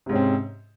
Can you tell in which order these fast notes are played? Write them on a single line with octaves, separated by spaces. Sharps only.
C3 G#2 C#4 C4